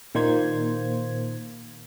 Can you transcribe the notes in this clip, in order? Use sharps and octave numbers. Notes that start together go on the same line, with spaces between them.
A#2 D#3 A#3 C5 G#6